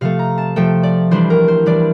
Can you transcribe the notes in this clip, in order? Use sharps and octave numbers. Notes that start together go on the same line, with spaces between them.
C3 F3 A3 F5
A#5
A5
C3 F3 A3 G5
D5
E3 G3 D4 C5
A#4
C5
E3 G3 D4 D5